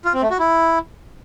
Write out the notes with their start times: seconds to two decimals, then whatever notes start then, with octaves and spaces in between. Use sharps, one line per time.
0.05 F4
0.13 C4
0.22 A3
0.30 F#4
0.39 E4